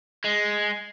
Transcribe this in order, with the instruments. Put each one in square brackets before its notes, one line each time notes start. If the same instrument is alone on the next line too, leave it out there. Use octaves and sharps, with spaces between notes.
[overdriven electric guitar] G#3